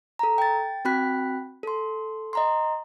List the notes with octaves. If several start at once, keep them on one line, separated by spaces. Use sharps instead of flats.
A4 A#5
G5 A6
C4 F#4 G5 B5 F#6 B6
A4 C6
D#5 A#5 C6